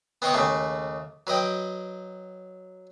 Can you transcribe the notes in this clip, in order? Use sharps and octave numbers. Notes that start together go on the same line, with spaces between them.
B3 C4 D#5 G5 C#6
D#2 C#3 A3
F#3 B4 D#5 G5